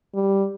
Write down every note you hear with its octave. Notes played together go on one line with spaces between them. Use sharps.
G3